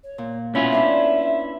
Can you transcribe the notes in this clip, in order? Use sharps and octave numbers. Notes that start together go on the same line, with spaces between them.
C#5
A#2
B2 C#4 E4 F4 G#5
D4 B4 E5 C6